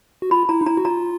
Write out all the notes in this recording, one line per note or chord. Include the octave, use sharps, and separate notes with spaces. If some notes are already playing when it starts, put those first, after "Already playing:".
F#4
F4 B5
E4 A#5
D#4
E4 A#5
F#4
F4 A#5